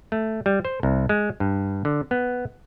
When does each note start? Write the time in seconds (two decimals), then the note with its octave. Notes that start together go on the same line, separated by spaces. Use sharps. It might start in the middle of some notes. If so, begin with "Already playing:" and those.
0.12 A3
0.46 G3
0.65 C5
0.83 C2
1.09 G#3
1.40 G2
1.85 D3
2.11 B3